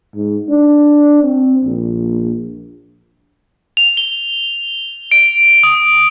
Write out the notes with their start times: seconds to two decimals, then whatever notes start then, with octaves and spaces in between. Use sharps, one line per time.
0.15 G#2
0.49 D4
1.23 C4
1.64 A#1
3.77 F7
3.97 G7
5.12 D7
5.63 D#6